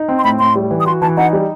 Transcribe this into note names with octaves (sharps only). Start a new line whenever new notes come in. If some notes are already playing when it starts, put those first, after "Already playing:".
Already playing: D#4
C4
C6
A2 B5
A2 C6
G3
E3
D#6
F#4 C6
E3 A5
D#4 F#5
G3